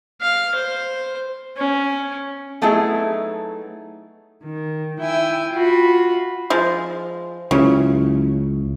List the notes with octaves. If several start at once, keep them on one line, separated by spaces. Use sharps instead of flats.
F5
C5
C#4
F#3 A3 B3 D#4 E4 G#4
D#3
E4 G5 G#5 E6
F4 F#4 B5
F3 G#3
C#2 C#3 F#3 C#4 E4